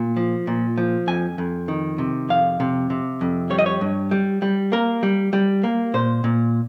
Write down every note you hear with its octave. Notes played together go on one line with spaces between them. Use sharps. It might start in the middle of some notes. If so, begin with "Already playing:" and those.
Already playing: A#2
F3
A#2
F3
F2 G#5
F2
D#3
C3
F2 F5
C3
C3
F2
G3 C#5
D#5
C#5
G2
G3
G3
A#3 A#4
G3
G3
A#3
A#2 C5
A#2